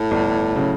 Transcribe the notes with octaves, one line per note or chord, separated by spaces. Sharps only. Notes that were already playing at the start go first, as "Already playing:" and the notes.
Already playing: A2
G1
C#3 F#3